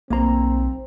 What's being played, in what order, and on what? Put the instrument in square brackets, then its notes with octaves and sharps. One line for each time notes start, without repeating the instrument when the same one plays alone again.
[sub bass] B1 [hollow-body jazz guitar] A#3 A#5 [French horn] C4